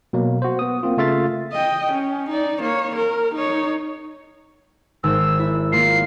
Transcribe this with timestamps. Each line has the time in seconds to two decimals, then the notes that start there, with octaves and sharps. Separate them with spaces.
0.13 B2 F#3 A#3
0.42 F#4 C5
0.59 B3 D#6
0.83 A#3 C4 F4
0.97 C#3 A3 F4 E5 F5 A6
1.53 D#5 G5
1.92 C#4
2.29 D#4 D5
2.61 A#3 C#5
2.96 A#4
3.35 D#4 C#5
5.04 G#1 C5 E6
5.39 E4
5.72 A#3 F4 C7